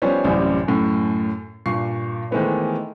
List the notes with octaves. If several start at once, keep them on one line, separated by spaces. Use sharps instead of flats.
F3 G3 B3 C#4 C5 C#5
A1 F#2 C3 E3 G3
F#2 A2
G2 A#2 C#6 C7
D#3 E3 G#3 A3 B3 C4